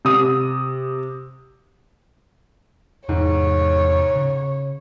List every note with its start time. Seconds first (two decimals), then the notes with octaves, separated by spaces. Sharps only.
0.05 C3 D#6
3.09 E2 G#2 C3 G#3 C#5
4.16 C#3